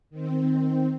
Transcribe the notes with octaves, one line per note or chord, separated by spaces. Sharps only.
D#3 C4